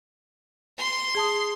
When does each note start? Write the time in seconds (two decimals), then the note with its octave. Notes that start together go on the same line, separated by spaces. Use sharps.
0.78 C6
1.15 G#4 A5 D#6